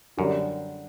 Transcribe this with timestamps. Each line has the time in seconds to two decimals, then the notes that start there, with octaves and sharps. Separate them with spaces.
0.17 F#2 D3 G3 D4